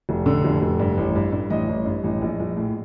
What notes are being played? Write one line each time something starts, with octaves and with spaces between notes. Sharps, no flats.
F1
D3
F1
F1
G2
A1
G2
G2
A1 D#5
A1
G2
A1
A#1
A#1
A2